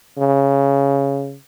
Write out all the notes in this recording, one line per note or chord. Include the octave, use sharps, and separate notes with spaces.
C#3